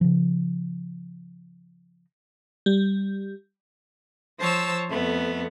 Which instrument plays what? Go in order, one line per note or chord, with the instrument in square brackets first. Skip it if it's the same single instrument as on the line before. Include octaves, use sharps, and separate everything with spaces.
[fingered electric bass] C#3 F3
[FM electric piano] G3
[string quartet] F3 C5 C#5 A5 E6
F2 A3 B3